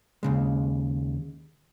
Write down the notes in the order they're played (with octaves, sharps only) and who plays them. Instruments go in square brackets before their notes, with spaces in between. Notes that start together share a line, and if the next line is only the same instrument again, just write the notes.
[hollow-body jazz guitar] D#2 C#3 G#3